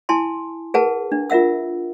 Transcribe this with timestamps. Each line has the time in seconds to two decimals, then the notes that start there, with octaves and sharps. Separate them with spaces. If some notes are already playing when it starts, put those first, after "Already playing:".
0.09 E4 G#5 A5 C6
0.74 G#4 A#4 B4 F#5 A5
1.12 D4
1.30 F4 A#4 E5 F#5 E6